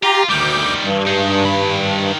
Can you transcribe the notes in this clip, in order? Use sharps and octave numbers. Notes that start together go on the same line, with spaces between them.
F4 G4 A#5
D2 D#3 G3 D6 G6
G2
D#4 G#4
D#3 B5